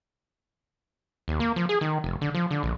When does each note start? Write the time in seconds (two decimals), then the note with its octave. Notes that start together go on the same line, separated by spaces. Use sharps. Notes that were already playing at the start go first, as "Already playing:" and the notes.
1.28 D#2
1.40 A#3
1.56 F3
1.69 G#4
1.81 D#3
2.04 F1
2.21 D3
2.35 F3
2.51 D3
2.63 A#1